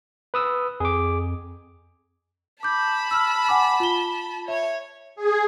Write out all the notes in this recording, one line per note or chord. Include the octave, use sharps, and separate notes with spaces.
B4 D#6 E6
F2 G#4 D6
A5 B5 D6 G6
E6 F6
F#5 G#5 D6
F4 G7
C#5 E5
G#4